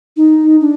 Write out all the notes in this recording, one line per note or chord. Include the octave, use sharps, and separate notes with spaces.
D#4
D4